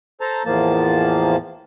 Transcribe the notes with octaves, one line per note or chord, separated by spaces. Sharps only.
A4 C5 A5 A#5
E2 A2 F3 A#3 A5